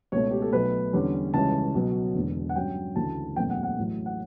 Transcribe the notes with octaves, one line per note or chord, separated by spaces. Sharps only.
C#2 B2 A3 C#5
G4
A4
B1 B2 A3 B4
E2 D3 G3 C#4
C#2 C#3 E3 G3 C#4 A5
B1 B2 F#3
E1 E2 D3
F#5
G2 F#3 C#4 G5
D2 C#3 E3 A5
F#1 E2 B2 A3 C#4 G5
F#5
F#5
A1 A2 F#3
F#5